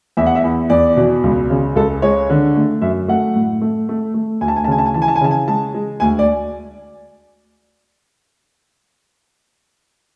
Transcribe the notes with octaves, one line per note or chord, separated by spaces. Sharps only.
E2 E5
F#5
E5
E2
E2 D5
B2
C#2
C#3
C#2 A4
G#3 C#5
D3
A3
F#2 E5
A3 F#5
A2
A3
A3
A3
D2 G#5
A5
G#5
A5
C#3 G#5
A5
G#5
E3 A5
G#5
A5
G#5
C#3 A5
G#5
G#3 A5
G#3
D2 G#5
D5